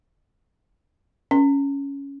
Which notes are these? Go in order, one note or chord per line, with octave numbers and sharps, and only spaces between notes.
C#4